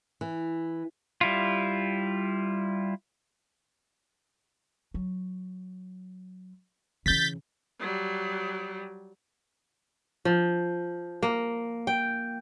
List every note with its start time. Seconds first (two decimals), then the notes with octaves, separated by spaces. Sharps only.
0.21 E3
1.21 G3 E4 F4
4.94 F#3
7.06 C#3 E3 G6 A6 B6
7.80 F#3 G3
10.25 F3
11.23 A#3
11.87 G5